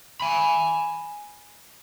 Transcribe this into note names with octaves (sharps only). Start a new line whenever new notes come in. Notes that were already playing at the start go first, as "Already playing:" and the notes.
G#5 B5